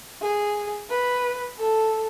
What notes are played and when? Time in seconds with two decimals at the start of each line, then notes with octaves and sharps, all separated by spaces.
0.22 G#4
0.89 B4
1.58 A4